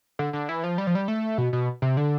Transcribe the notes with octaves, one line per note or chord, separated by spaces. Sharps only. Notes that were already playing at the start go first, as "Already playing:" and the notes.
D3
D3
E3
F3
G3
F3
G3
A3
B2
B2
C3
D3